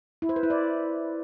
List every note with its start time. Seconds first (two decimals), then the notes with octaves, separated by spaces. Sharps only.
0.22 E4
0.29 C5
0.36 B4
0.43 E4
0.50 D5